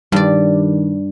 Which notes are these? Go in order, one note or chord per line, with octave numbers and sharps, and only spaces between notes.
G2 D#3 G3 D5